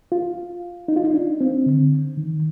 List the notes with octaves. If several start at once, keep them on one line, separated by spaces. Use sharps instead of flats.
F4
D#4
F4
D#4
D4
C4
D3
D#3